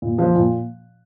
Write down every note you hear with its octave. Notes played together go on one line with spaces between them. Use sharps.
A#2
F3
A#2